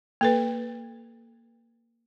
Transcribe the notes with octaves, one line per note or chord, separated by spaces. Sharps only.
A#3 A4 B4